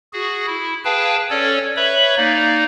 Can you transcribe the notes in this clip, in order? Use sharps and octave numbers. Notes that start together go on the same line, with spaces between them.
F#4 G#4
E4
G#4 B4 F5 G5 A5
C#4 A4 C#5 D5
B4 C#5 E5 B5
A#3 D#4 D5